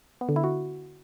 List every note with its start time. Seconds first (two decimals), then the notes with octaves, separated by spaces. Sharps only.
0.21 B3
0.29 D3
0.36 E4
0.44 F#4